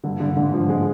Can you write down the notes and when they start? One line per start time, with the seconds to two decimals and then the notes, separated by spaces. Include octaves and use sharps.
0.04 G2 D3
0.20 G2 D3
0.30 G2
0.37 G#2 D3
0.54 F3
0.69 G#3